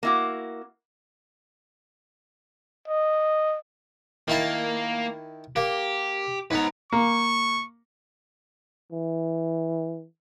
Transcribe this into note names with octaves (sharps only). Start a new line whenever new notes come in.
A#3 E4 F#4
D#5
D#3 A#3 E4 A5
A#3 G4
G#2 B3 B4 A#5
A#3 C#6
E3